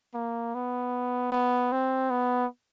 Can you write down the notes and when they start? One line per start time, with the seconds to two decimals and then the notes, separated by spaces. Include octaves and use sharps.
0.14 A#3
0.55 B3
1.32 B3
1.72 C4
2.10 B3